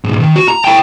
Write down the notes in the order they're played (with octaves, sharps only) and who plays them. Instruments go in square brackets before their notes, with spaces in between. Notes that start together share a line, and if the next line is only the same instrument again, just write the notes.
[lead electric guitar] B1 G#2
D#3
F#4
A#5
E4 G5